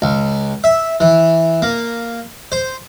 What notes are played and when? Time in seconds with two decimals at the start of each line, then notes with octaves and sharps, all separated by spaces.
0.02 C#2
0.64 E5
1.00 E3
1.62 A#3
2.52 C5